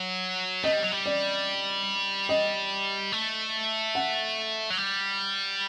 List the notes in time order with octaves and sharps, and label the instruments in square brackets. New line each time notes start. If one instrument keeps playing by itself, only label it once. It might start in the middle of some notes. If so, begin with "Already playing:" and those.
Already playing: [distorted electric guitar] F#3
[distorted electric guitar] A3 [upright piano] D#5
[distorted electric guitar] G3
F#3
G3
[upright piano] D5
D#5
[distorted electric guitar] A3
[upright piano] F#5
[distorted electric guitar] F#3
G3